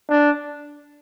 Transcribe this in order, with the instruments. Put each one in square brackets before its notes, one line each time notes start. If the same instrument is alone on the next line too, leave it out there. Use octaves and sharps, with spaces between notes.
[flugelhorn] D4